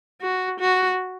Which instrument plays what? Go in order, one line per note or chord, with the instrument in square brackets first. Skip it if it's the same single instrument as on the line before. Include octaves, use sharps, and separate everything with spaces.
[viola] F#4
F#4